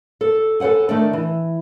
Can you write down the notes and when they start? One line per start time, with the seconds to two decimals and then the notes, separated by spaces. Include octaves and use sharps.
0.21 A4
0.60 A4 B4 C5 F#5 G#5
0.89 D#3 A3 D4
1.13 E3